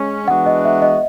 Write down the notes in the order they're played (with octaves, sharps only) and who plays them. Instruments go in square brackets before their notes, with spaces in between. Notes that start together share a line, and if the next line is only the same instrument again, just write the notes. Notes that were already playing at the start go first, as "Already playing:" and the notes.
Already playing: [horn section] G#3 C#4
[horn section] E3 G#3 B3 D4 F#4 [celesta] F#5
[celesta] D#5
E5
D#5